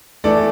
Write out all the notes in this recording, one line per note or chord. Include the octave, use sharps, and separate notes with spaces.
E3 A3 A4 D5